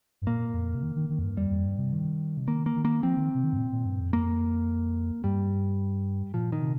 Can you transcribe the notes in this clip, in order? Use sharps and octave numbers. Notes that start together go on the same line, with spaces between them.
G2
A#2 A#3
F2
C3
D#3
D#3
D#3
F2
G2
F2 G3
F2
G2
C3
D#3
C3
D#3 A#3
A#3
D#3
A#3
F3 C4
D#3
C3
D#3
G2
A#2
A#2
G2
F2
A#3
G2 G3
A#2 F3
D#3
C3